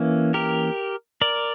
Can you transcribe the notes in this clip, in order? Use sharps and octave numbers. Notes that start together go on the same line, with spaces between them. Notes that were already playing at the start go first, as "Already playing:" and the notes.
Already playing: E3 A#3 C#4
G4 A#4
A#4 D5